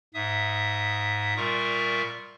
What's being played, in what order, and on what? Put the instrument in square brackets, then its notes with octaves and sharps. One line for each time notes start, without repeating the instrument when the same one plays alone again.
[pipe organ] G#2 E5 D#6
A#2 G3 F4 A#4 E5 C#6